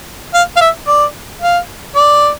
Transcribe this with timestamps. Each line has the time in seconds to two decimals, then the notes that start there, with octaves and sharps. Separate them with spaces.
0.34 F5
0.57 F5
0.61 E5
0.88 D5
1.42 F5
1.96 D5